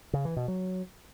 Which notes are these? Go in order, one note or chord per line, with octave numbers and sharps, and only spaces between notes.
C#3
E3
B2
F#3